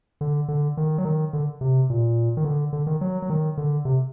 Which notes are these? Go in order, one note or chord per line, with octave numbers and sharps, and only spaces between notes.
D3
D3
D#3
F#3
D#3
D3
C3
A#2
D#3
D3
D3
D#3
F#3
F#3
D#3
D3
C3